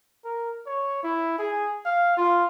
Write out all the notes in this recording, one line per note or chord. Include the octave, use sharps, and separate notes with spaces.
A#4
C#5
E4
G#4
F5
F4